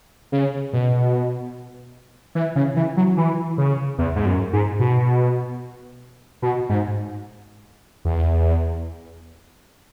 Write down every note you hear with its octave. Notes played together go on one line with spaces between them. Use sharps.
C#3
B2
E3
C#3
E3
F#3
E3
C#3
E2
G#2
F#2
G#2
B2
B2
G#2
E2